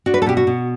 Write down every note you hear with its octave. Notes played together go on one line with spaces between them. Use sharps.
D4 F#4
B4
A4
B2 G4
F#4
B2